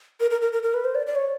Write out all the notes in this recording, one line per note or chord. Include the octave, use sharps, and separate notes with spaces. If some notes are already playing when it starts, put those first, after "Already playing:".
A#4
A#4
A#4
A#4
A#4
B4
C5
D5
D5
C#5